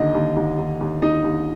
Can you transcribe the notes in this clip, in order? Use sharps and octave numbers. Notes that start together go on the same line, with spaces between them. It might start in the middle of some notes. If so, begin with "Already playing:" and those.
Already playing: D#2 D3 D#4 D#5
D#2
D#2
D#2
D#2
D#2 D#4 D#5
D#2